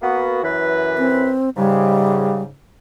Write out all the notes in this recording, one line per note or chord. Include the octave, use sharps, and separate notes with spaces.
A#3 B3 F#4
F#2 E3 B4
C4
G#2 C#3 G3